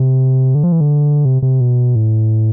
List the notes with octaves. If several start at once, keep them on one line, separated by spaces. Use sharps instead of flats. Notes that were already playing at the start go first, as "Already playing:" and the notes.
Already playing: C3
D3
F3
E3
D3
C3
C3
B2
A2